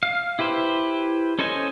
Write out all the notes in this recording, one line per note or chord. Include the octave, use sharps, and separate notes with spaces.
F5
E4 G4 B4 C5
C#4 A4 C5 D#5 G#5